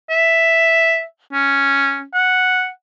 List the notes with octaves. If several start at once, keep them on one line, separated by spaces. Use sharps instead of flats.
E5
C#4
F#5